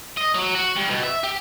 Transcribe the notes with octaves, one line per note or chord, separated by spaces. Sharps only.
D#5
F#3
F#4
G2
B2
E5
G4